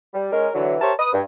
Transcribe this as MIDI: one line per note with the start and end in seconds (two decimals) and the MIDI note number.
0.14 0.30 55
0.32 0.48 56
0.32 0.48 61
0.32 0.48 70
0.54 0.76 50
0.54 0.76 52
0.54 0.76 54
0.81 0.92 67
0.81 0.92 70
0.81 0.92 72
0.81 0.92 73
0.81 0.92 76
0.81 0.92 81
0.99 1.09 71
0.99 1.09 87
1.13 1.20 43